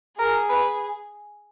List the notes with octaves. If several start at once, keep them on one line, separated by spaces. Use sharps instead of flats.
G#4 A#4
B4